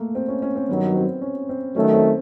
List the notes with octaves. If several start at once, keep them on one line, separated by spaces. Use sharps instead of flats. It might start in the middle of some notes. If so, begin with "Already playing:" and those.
Already playing: A3 A#3
C4
C#4
C#4
C4
G2 D#3 F#3 B3
C4
C#4
C4
D#3 F#3 A3 C#4
C4